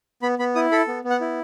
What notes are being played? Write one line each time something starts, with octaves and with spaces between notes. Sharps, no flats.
B3 B5
B3 B5
E4 D#6
A4 B5
B3
B3
F#5
E4